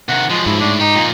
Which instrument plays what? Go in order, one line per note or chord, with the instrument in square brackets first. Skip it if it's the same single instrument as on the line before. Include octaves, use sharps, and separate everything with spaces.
[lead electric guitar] C3 D#3 [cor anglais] F#5
[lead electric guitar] F3 F#3 [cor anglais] G#3
[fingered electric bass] G#2 [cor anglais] E4
[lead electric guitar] A2 [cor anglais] D4
[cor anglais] D#4 [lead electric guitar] G4
[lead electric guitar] F2 A#2